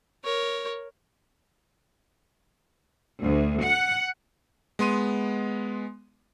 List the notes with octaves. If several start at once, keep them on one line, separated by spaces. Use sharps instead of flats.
A#4 C#5
D2
F#5
G#3 B3 C6 D#7